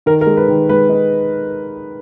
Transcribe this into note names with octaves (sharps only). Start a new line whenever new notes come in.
D#3 A#4
A#4
G#3
B4
D#3
G#3 B4
D#4